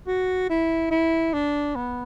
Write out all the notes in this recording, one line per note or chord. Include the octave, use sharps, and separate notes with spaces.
F#4
E4
E4
D4
B3